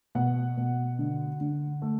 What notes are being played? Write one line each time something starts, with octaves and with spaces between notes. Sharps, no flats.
B2 F#5
B2
D3
D3
A3